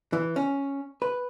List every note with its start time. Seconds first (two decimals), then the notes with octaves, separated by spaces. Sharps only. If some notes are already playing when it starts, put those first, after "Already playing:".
0.13 E3
0.36 C#4
1.02 B4